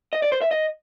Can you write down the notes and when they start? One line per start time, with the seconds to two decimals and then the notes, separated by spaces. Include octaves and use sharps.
0.13 D#5
0.22 D5
0.32 C5
0.41 E5
0.51 D#5